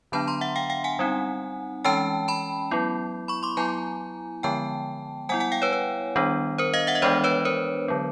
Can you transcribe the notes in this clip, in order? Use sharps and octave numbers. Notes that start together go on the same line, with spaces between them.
D3 F#3 B3 D4 A5 B5
A#5 C6
E5 F#5
F5 G5
F5 G5
F#5 G#5
G3 C4 D#4
E3 G#3 C#4 G5 A5
A5 B5
F#3 B3 E4
B5 C#6
C6 D6
F#3 B3 E4 G#5 A#5
D3 F3 G#3 B3 G5 A5
G3 B3 E4 F#5 G#5
F#5 G#5
F5 G5
B4 C#5
B4
D#3 G3 B3 D4
A#4 C5
D#5 F5
E5 F#5
D#5
E3 G#3 B3 D4 C5 D5
B4 C#5
A#4 C5
D3 F#3 B3